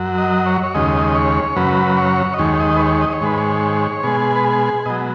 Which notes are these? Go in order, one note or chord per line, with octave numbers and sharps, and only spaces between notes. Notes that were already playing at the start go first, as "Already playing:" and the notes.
Already playing: F#2 F#3
D#5
C#5
C#5
D#2 C#3 G#3 D#5
C#5
F#2 C#3 F#3 B4
C#5
D#5
D#2 D#3 G#3 C#5
D#5
B4
C#5
D#5
C#5
G#2 D#3 G#3 B4
C#5
B2 G#3 G#4
B4
G#4
B2 F#3 D#5